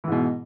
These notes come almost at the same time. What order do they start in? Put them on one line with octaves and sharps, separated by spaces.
E3 G#2 B2